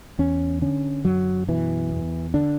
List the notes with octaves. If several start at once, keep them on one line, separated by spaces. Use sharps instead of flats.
E2 C#4
D3 C#4
F#2 F#3
B2 E3
E2
D3 D4